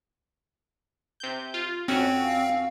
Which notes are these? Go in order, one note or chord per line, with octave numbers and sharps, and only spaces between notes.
C3 G6
F4
F2 C4 C#4 F#4
F5